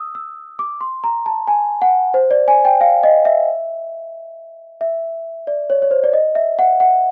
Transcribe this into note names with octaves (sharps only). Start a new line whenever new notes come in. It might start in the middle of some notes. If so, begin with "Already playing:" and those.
Already playing: D#6 E6
E6
D6
C6
A#5
A5
G#5
F#5
C5
D5
G#5
G5
F5
D#5
E5
E5
D5
C#5
C#5
C5
D5
D#5
E5
F#5
F#5